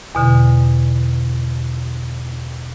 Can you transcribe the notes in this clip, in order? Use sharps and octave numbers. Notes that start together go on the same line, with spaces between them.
E2 B2 D3